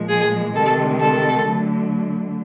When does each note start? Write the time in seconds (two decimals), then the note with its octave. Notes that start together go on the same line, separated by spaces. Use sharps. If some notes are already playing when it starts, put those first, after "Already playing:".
Already playing: A#2 F3 G#3
0.09 G#4
0.54 C3 D#3 G#3 A4
0.99 A4
1.44 D3 F#3 A3